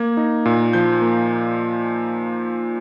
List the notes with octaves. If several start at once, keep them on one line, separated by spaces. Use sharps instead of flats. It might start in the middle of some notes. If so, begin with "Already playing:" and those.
Already playing: A#3 G#6
D#4
A#2
F3 G6
A#3